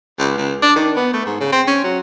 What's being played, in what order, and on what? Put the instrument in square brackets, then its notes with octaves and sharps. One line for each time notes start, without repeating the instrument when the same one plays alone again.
[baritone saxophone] C#2
C#2
D4
D#3
B3
A3
G#2
C#3
C4
C#4
F#3